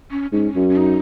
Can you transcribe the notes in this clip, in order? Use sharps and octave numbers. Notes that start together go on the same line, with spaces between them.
C#4
G#2 C#4
F#2
C#4
D#4